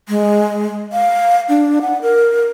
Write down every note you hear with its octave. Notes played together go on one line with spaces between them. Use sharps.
G#3
F5
D4
F#5
A#4